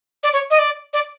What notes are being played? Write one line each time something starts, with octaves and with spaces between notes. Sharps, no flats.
D5
C#5
D#5
D5
D5